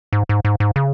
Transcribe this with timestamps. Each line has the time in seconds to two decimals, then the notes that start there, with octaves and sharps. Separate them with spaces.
0.13 G#2
0.29 G#2
0.45 G#2
0.60 G#2
0.76 C#3